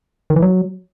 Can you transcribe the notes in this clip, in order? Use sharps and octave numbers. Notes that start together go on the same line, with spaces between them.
D#3
E3
F#3